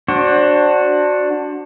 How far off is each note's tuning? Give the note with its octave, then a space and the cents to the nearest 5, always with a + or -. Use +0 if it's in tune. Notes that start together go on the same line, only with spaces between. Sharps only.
D4 +5 F#4 +0 C5 +30